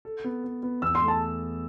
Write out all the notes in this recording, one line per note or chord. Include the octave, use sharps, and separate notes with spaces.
A4
B3
B3
B3
E2 E6
C6
A3
A5